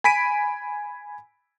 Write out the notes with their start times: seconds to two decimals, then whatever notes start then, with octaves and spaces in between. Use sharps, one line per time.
0.04 G#5 B5 B6 D7 D#7